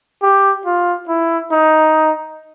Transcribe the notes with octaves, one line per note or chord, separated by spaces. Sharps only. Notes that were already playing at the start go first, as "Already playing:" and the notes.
G4
F4
E4
D#4